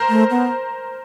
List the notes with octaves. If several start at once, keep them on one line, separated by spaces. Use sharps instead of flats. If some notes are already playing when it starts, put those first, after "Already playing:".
Already playing: A#4 C5
A3
B3